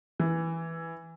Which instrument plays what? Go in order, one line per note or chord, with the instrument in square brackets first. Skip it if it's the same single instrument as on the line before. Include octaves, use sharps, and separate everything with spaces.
[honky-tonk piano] E3